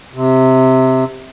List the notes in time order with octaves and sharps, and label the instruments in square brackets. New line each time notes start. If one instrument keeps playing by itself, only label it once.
[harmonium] C3